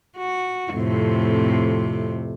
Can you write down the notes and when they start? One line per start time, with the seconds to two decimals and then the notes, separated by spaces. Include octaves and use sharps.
0.17 F#4
0.72 F2 A2 C3